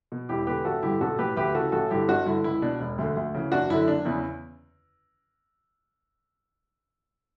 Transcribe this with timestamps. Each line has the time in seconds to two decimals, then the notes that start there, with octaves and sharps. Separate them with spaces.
0.12 B2
0.29 E1 E4 G4
0.47 E2 D3 G4 B4
0.65 A1 F#4 A4
0.83 G2 D3 E4 G4
1.01 B1 F#4 A4
1.18 A2 E3 G4 B4
1.37 D2 G4 B4
1.55 C#3 E3 F#4 A4
1.72 A1 F#4 A4
1.90 G2 D3 E4 G4
2.08 G1 D4 F#4
2.26 G2 D3 E4
2.44 C#2 E4
2.62 B2 D4
2.80 E1
2.98 D2 D3
3.17 D2
3.34 C#3 E3
3.52 F#1 D4 F#4
3.70 F#2 D3 E4
3.88 F#1 D4
4.05 E2 C#3 E3 E4